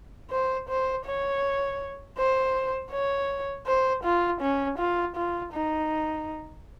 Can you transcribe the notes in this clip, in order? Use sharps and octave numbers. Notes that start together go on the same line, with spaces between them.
C5
C5
C#5
C5
C#5
C5
F4
C#4
F4
F4
D#4